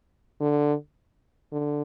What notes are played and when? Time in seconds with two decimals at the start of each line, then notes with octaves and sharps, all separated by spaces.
0.41 D3
1.52 D3